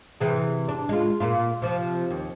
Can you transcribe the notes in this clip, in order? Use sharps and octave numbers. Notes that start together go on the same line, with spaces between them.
C3 E3 G#4
D4
G#3 F4
A#2 A#3 F4
C3 F3
D#2